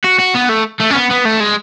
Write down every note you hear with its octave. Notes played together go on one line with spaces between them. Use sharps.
F#4
F#4
B3
A3
A3
C#4
B3
B3
A3
G#3